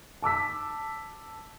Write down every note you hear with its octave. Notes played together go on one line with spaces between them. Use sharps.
A5 D6 E6 B6